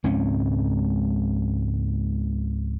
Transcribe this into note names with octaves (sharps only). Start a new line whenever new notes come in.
C#2 G#2 C4 C#4